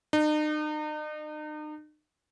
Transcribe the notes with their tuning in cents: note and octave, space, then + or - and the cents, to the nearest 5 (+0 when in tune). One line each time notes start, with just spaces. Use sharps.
D#4 -40